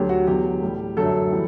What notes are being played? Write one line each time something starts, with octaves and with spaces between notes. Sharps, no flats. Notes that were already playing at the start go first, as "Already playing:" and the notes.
Already playing: D2 D3 F#3 G4
F#4
E2 D3 F#3 G4
A2 G3
F#2 D3 F#3 A3 A4
E3 G3